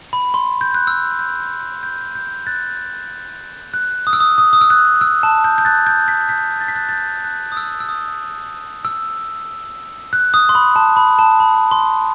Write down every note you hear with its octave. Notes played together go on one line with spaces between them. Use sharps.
B5
C6
G6
F#6
E6
G6
G6
G6
F#6 A6
F#6
D#6
E6
D#6
D#6
D#6
E6
F#6
E6
A5
G6
G6
F#6 A6
G6
G6 B6
G6 B6
A6
B6
F#6 A6
A6
G6
F#6
D#6
E6
E6
D#6
E6
F#6
D#6
C6
B5
A5
B5
A5
B5
C6